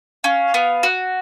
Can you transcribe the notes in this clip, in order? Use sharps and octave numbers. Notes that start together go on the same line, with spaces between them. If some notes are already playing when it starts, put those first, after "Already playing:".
C#4 F5
B3
F#4